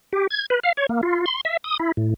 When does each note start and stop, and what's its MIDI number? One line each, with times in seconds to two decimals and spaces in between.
0.13 0.27 67
0.30 0.46 92
0.50 0.60 71
0.63 0.72 77
0.77 0.86 73
0.89 1.01 58
1.03 1.25 65
1.26 1.41 84
1.45 1.57 76
1.64 1.77 87
1.79 1.92 64
1.97 2.14 45